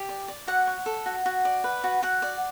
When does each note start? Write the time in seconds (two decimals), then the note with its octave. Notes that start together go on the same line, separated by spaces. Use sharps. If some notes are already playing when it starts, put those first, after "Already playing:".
Already playing: G4
0.09 D5
0.28 D5
0.47 F#4 F#5
0.67 C#5
0.86 A4
1.06 F#4
1.26 F#4
1.45 D5
1.64 B4
1.84 F#4
2.03 F#4 F#5
2.22 D5